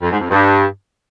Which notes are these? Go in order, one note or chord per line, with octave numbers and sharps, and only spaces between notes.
F2
G#2
F2
G2